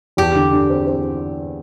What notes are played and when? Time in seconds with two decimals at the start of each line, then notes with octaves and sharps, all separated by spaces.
0.17 E2 G4
0.35 D3
0.53 D3
0.70 C4
0.87 C4